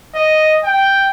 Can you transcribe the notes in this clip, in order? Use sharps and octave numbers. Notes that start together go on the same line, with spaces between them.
D#5
G5